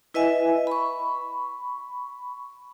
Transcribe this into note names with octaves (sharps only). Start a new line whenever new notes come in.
E4 B4 D#5 E5 G#5
B5 C#6